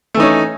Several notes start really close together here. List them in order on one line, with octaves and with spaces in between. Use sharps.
A3 E3 D#4 C#4